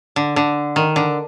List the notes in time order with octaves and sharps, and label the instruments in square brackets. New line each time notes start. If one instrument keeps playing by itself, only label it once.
[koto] D3
D3
D#3
D3